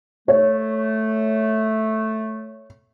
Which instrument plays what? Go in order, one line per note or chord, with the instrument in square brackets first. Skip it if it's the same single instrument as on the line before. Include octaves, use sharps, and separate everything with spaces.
[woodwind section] A3 [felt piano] C#5